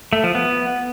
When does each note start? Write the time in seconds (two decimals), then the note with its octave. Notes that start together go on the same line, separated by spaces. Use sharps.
0.13 A3
0.24 F3
0.35 B3